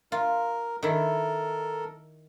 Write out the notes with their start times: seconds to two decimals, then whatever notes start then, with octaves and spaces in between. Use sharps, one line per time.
0.12 F4 A#4
0.83 D#3 E4 A4 A#4